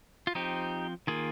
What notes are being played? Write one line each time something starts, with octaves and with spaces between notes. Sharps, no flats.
F4
F3 C4 D#4 G4
D#3 A#3 F4 G#4